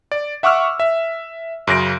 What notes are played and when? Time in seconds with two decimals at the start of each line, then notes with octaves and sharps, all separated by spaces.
0.12 D5
0.43 E5 F#5 C#6 D6 E6 F6
0.80 E5
1.67 F#2 C#3 A#6 D7